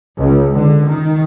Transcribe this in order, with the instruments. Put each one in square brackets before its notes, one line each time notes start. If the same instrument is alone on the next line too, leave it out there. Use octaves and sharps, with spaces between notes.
[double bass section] C#2
D3
D#3